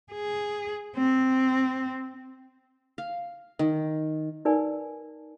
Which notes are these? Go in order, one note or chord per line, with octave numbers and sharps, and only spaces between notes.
G#4
C4
F5
D#3
D#4 A#4 B4 D5 G#5